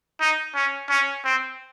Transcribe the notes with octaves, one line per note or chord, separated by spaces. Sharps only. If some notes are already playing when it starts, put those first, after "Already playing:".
D#4
C#4
C#4
C4